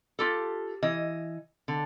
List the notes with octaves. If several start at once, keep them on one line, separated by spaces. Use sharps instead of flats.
F4 G4 A4
E3 D#5
D3